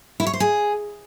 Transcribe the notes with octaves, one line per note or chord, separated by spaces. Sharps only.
E4
C#5
C5
G#4